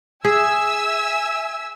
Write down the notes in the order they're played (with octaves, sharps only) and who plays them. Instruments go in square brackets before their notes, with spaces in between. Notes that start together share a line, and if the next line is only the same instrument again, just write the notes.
[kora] G#4 [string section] E5 G#5 E6